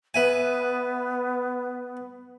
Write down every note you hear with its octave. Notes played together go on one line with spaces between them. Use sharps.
B3 B4 E5 G#5